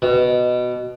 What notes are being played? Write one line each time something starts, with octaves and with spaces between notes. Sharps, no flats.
B2